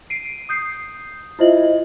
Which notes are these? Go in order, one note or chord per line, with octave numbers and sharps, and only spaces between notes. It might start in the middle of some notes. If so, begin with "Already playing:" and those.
C7 D7 D#7
D#6 G6 C7
E4 F4 C5 D#5 E5 F#7